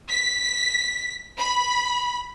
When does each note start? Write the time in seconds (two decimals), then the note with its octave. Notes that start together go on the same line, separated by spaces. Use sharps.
0.11 B6
1.41 B5